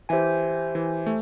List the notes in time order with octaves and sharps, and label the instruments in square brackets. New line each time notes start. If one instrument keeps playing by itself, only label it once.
[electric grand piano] E3 [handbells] G4 C5 E5 G#5
[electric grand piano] E3
A3